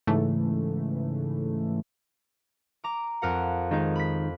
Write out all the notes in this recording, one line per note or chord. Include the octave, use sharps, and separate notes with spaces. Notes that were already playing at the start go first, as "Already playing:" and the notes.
G#2 C#3 E3 A3
A#5 D6
F2 A#4 F#5
D#3 G#3 D#4
B5 B6